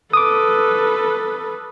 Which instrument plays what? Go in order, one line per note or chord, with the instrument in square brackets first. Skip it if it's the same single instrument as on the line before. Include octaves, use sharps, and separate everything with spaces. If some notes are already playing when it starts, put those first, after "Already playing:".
[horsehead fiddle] A4 B4 [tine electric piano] D6 D#6